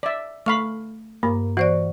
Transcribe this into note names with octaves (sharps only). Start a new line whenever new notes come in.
D5 E5
A3 F5 B5 C#6
G2 A#3
E3 F#4 C5 D5